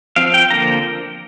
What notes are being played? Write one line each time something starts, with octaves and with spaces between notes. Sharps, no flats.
F3 C4 F5
G5
D3 F3 A#3 A#5